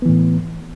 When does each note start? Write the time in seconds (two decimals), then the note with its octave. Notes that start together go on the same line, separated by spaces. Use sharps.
0.02 B3
0.06 E3
0.09 A2